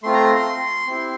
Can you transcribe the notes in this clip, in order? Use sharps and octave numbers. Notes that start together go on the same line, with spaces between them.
A3 C4 F4 C6
A#5
C6
C6
C4 E4 G4